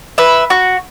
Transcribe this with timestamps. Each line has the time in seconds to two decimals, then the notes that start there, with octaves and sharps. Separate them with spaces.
0.18 B4 E5
0.50 F#4